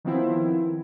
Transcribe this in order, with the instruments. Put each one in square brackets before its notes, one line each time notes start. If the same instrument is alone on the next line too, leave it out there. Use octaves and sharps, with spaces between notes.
[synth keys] D#3 F3 B3 C4 E4